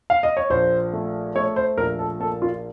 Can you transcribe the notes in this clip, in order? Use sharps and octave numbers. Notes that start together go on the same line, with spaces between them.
F5
D#5
C#5
A#1 C5
A3
A3 C#5
C5
A#1 A#4
A4
A#3 A4
F4